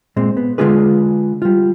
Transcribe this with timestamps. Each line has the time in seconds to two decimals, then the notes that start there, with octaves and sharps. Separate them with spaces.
0.16 A#2 G#3 C4
0.37 B3
0.58 D3 G#3 D4 F4 G#4 B4
1.42 G3 F4